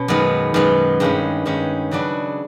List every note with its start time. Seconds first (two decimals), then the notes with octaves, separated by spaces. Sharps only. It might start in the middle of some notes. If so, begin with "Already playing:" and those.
Already playing: B2 C#4
0.08 F#2 D#3 G#3 B3
0.54 F#2 D#3 G#3 B3
1.00 G2 D#3 G#3 C#4
1.45 G2 D#3 G#3 C#4
1.91 C#3 F#3 B3 D4 F#4